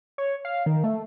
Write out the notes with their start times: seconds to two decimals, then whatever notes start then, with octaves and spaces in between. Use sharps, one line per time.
0.18 C#5
0.45 F5
0.66 D#3
0.84 A3